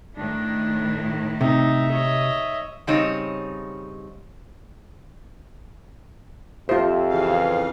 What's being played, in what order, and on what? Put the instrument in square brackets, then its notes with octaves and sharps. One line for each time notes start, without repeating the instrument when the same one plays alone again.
[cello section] A2 D#3 E4 [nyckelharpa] D4
[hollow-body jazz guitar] C3 [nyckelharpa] D#4 [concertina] E5
[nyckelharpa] C#5 D#5
[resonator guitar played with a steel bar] C#3 G3 C4 D#4 C#5 D#5
[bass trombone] F2 [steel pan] F4 C5 [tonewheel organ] G4 E5
[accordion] C#3 E3 F5